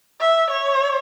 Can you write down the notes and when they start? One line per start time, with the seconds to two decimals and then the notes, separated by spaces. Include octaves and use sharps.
0.20 E5
0.51 C#5